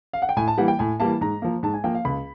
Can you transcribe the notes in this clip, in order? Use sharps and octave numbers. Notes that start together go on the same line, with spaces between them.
F5
F#5
G5
A2 G#5
A5
E3 G3 A#3 F#5
G5
A2 G#5
E3 G3 A#3 A5
G#2 A#5
F3 A#3
G#2 A5
G#5
F3 A#3 G5
F5
C#2 B5